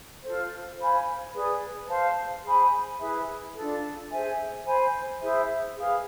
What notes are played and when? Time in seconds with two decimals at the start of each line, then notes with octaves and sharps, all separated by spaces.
0.22 F4 A4 C5
0.77 C5 F5 G#5 B5
1.34 G#4 B4 D5
1.88 C5 F5 A5 C6
2.44 G#4 C5 G#5 B5
3.00 E4 G#4 B4 E5
3.55 D4 F4 A4
4.10 G#4 C5 E5 G#5
4.66 C5 G#5 B5
5.21 E4 G#4 C5 E5
5.76 G#4 B4 F5